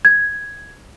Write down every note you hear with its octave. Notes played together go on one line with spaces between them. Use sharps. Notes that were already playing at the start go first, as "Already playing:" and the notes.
G#6